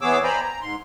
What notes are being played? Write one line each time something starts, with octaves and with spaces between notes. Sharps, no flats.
E3 B3 G#4 C#5 D6 E6
C5 D5 G5 G#5 A#5 B5
A#5
G#2 C6